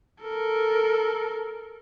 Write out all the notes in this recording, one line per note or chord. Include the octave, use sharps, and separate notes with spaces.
A4 A#4